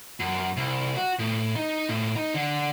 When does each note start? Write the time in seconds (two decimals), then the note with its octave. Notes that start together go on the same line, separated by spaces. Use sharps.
0.20 F#2
0.57 C2
0.97 F#4
1.19 A2
1.56 D#4
1.89 A2
2.16 D#4
2.34 D3